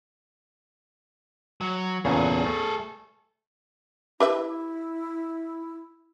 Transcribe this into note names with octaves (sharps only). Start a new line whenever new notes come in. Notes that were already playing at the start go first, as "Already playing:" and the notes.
F#3
E2 A#2 C#3 G#4 A4
A3
E4 G4 B4 E5